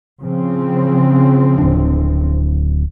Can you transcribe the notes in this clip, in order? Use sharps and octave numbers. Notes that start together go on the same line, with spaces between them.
C#3 F3 C4
D1 D4